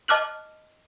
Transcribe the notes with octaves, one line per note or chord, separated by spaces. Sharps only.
D#5 A5 D6 F6 F#6 F#7